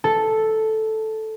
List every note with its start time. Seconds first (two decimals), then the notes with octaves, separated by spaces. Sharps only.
0.04 A4